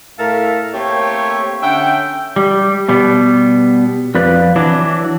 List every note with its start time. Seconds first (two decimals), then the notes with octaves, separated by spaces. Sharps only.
0.19 A2 A3 A4 A#4 E5 F5
0.73 A3 A#3 C4 G4 C#5
1.62 D3 C#4 E5 F#5 G5
2.36 G3
2.88 B2 G3 B3
4.15 F2 F3 B4 D5
4.56 E3 F#3 D4